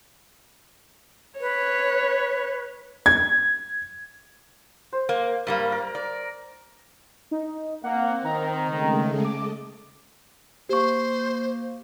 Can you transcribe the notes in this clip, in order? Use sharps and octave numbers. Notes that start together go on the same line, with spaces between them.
B4 C#5
G#6
C5
A#3
G2 G3 A#3
A#4
D5
D#4
A#3 C4 F#5
D#3 A#5
C#3 G#3 A3
D#5 A5 D6
A#3 G4 C5 C#6